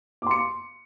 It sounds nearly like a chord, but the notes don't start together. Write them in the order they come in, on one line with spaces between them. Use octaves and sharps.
D6 C6 C#7